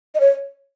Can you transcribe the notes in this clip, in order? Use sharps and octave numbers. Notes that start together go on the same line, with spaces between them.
D#5
C#5